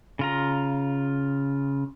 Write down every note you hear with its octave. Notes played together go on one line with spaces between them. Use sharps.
C#3 F4 A#5